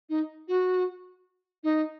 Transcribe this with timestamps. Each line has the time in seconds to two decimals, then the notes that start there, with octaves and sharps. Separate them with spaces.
0.09 D#4
0.47 F#4
1.63 D#4